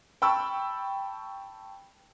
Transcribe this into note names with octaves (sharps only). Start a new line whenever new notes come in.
G5 A5 B5 C#6 E6